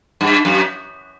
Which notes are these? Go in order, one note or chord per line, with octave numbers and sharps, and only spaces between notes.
G2
F#2